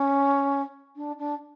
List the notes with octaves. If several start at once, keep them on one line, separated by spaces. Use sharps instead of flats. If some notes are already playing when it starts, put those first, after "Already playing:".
Already playing: C#4
D4
D4